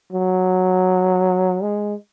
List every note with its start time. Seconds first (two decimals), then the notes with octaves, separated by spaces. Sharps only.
0.13 F#3
1.63 G#3